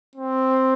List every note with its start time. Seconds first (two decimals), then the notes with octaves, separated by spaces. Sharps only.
0.15 C4